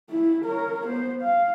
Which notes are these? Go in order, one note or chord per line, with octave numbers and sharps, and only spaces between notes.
E4
A#4 C#5
B3 C5
F5